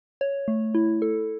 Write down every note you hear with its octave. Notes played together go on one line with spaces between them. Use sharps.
C#5
A3
E4
A4